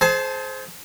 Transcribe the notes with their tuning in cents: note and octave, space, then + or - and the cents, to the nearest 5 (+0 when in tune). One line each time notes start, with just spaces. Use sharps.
G#4 +35 C5 +0 A5 +0